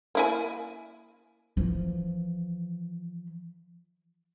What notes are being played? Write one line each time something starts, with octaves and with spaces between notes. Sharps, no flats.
A#3 E4 G#5
E3 F3